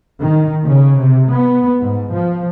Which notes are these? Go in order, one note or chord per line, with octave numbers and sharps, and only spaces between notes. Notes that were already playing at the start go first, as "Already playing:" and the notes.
D#3
C#3
C3
B3
G#2
F3